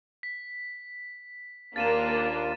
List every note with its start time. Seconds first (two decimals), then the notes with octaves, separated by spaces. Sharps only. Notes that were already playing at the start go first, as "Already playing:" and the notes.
0.23 B6
1.76 D#2 A#3 D4 F4 A#4 A6 D#7 E7